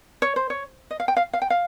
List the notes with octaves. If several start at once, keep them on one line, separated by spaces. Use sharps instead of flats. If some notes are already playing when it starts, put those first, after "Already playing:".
C#5
C5
C#5
D#5
F5
G5
F5
F5
G5
F5